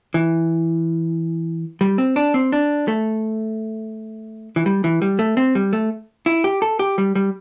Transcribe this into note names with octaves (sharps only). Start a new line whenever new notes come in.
E3
G3
C4
D4
C4
D4
A3
E3
G3
E3
G3
A3
C4
G3
A3
E4
G4
A4
G4
G3
G3